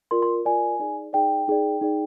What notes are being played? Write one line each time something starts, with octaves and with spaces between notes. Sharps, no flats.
F4 A#4 D5 C6
C6
F4 A#4 D5 G#5
D#4 G#4 D5
D#4 G#4 D5 G5
D#4 G#4 D5
D#4 G#4 D5